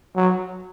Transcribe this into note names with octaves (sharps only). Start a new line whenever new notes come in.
F#3